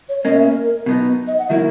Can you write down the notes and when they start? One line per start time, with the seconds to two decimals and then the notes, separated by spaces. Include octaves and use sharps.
0.09 C#5
0.25 B2 A#3 C#4 D#5
0.35 E5
0.45 A#4
0.86 B2 F#3 B3 D#4
1.28 D#5
1.39 F#5
1.48 D#3 F#3 A#3 E4 E5